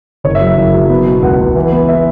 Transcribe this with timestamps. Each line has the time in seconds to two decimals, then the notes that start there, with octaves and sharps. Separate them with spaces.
0.24 F#1 C#5
0.35 E5
0.41 F#3
0.47 E5
0.57 F#1
0.74 F#3
0.89 B3
1.06 B2
1.22 C#2 F#5
1.39 C#2
1.55 E3
1.72 B3
1.89 E5